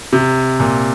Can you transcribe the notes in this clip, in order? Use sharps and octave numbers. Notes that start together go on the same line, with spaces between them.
C3
A#2